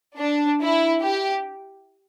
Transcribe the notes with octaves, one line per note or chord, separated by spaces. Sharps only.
D4
E4
G4